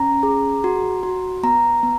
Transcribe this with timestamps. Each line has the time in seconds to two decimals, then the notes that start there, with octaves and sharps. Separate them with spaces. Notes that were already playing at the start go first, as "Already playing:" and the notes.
Already playing: C#4 A#5
0.23 G#4
0.64 F#4
1.03 F#4
1.43 B3 A#5
1.83 B3